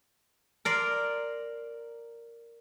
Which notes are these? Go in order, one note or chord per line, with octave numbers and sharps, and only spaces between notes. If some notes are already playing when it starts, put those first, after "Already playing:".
A#4 D5 C6